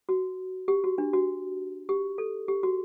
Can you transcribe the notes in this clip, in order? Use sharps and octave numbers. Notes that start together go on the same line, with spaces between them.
F#4
G4
F#4
D4
F#4
G4
A4
G4
F#4